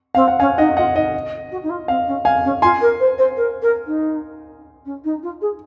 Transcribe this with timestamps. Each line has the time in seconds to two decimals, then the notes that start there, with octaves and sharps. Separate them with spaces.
0.15 C4 F5
0.28 F#5
0.40 C#4 F5 G#5
0.58 D#4 D#5 F#5
0.77 F4 D#5 F#5
0.95 D#4 D#5
1.51 F#4
1.63 D#4
1.70 F4
1.88 C4 F5
2.07 C#4
2.25 F5 G#5
2.44 C#4
2.62 F4 G#5 C6
2.81 A#4
3.00 C5
3.18 C5
3.36 A#4
3.62 A#4
3.86 D#4
4.85 C#4
5.04 D#4
5.23 F4
5.41 G#4